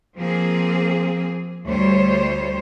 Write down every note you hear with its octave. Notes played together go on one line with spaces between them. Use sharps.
F3 A#3 C4 G#4
D2 G3 C5 C#5